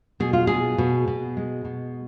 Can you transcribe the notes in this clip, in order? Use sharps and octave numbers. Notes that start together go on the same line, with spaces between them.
B2 G#4
F4
B2 G#4
B2
B2
G#3
B2